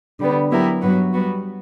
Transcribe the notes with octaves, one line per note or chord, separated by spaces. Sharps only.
D3 G3 B3
F#3 B3 E4 G4 A#4
G2 F#3 B3 F#4 B4
G3 B3 F#4